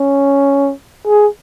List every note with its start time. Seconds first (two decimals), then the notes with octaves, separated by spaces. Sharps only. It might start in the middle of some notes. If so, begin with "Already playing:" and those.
Already playing: C#4
1.07 G#4